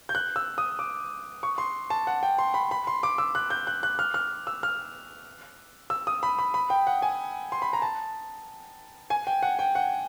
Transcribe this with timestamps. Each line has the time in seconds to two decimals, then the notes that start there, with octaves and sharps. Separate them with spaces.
0.09 G6
0.15 F#6
0.36 E6
0.58 D#6
0.79 D6
1.43 C#6
1.58 C6
1.90 A5
2.07 F#5
2.23 G5
2.38 C6
2.54 B5
2.71 B5
2.87 C6
3.03 D6
3.18 E6
3.35 F#6
3.50 G6
3.67 F#6
3.83 F#6
3.99 F6
4.14 F6
4.47 E6
4.63 F6
5.90 E6
6.07 D#6
6.23 B5
6.39 B5
6.54 B5
6.70 G5
6.87 F#5
7.02 G#5
7.52 C6
7.62 B5
7.73 A#5
7.82 A5
9.10 G#5
9.27 G5
9.42 F#5
9.59 G5
9.75 F#5